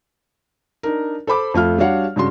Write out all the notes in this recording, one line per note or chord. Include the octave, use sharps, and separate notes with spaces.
D4 D#4 A#4
A4 C5 B5 D6
F2 A3 F4 F6
G3 D4 F#4 C#5 F5 F#5
G2 C#3 F#4 C6